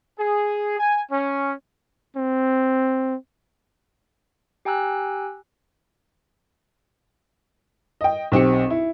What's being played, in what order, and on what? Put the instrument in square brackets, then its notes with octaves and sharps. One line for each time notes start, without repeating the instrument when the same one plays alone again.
[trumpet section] G#4
G#5
C#4
[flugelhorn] C4
[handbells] G4 G5 G#5 A#5 E6 F#6
[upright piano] D#5 G5
B1 C4 G4 C#7
E4